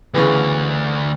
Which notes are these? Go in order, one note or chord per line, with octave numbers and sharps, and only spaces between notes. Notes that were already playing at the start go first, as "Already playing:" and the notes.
D2 C#3 E3 B3